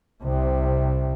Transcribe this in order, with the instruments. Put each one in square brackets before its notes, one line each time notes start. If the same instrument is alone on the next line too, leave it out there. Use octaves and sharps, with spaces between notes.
[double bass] C2 C3